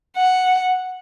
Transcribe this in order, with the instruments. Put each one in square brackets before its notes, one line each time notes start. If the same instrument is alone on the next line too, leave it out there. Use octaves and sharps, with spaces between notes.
[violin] F#5